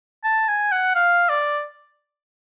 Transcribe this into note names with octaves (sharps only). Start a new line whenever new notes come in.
A5
G#5
F#5
F5
D5